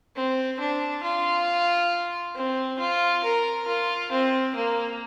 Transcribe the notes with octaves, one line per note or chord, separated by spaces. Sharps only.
C4
D4
F4
C4
F4
A#4
F4
C4
A#3